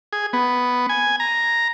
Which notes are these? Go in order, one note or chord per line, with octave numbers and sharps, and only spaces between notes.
G#4
B3
G#5
A#5